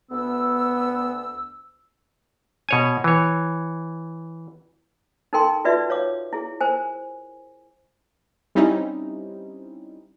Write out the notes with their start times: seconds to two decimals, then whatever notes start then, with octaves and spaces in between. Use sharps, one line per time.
0.11 D2 B3 E6
2.69 B2 C#5 G#5
3.04 E3 C#5
5.33 D#4 A4 A#4 G5 C6
5.65 D#4 F4 F#4 B4 D5 E5
5.90 C#5 F5 D6
6.33 E4 G#4
6.61 A#4 C5 G#5
8.55 G3 C4 C#4 D#4 E4